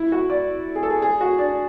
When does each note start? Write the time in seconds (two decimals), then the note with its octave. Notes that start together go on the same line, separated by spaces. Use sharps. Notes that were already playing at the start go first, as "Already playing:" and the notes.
Already playing: E4
0.12 F#4
0.30 D5
0.75 G#4
0.83 A4
0.90 G#4
1.02 G#4
1.21 F#4
1.38 D4